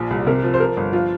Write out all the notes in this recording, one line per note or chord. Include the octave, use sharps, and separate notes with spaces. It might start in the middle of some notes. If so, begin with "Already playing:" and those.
Already playing: A#1 F3
C2
C3 A#4
F3
C5
F3 A#4
G1
F3 F4